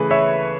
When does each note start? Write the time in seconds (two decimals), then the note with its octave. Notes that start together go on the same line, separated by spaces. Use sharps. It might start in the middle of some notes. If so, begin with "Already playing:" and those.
Already playing: C#3 E3 A3 G#4 B4
0.11 C#5 E5